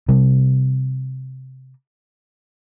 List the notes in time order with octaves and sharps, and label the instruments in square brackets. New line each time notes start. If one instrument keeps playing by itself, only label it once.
[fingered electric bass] C3 G3